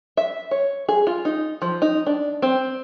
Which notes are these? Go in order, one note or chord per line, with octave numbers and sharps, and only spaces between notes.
E5
C#5
G#4
F4
D#4
F3
D#4
D4
C4